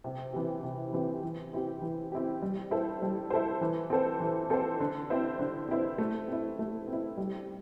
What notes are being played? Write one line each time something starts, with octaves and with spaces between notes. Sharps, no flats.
C3
E3 C4 G4
C3
E3 C4 G4
E3
C4 E4 G4
E3
C4 E4 G4
G3
E4 A4 C5
G3
E4 A4 C5
E3
C4 A4 C5
E3
C4 A4 C5
D3
C4 E4 C5
D3
C4 E4 C5
A3
C4 E4
A3
C4
E4
G3